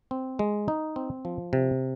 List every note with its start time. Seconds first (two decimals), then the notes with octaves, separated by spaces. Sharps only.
0.11 C4
0.39 G#3
0.68 D#4
0.96 C4
1.25 F3
1.53 C3